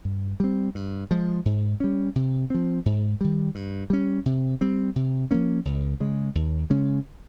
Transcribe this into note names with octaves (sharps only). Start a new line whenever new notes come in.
G2
G3 C4
G2
F3 G#3
G#2
G3 C#4
C3
F3 C4
G#2
D#3 G3
G2
G3 C#4
C3
G3 C4
C3
F3 A#3 C#4
C#2
C#3 G#3
D#2
C#3 G#3 C#4